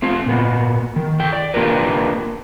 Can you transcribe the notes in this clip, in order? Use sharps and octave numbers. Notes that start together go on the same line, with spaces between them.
A3 C4 F4
A#2 B3
D#3
A4 G5
D5
A#3 D4 F4 G4 A#4 B4